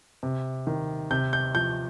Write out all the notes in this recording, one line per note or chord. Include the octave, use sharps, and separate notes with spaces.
C3
D#3
C3 G6
G6
F3 G6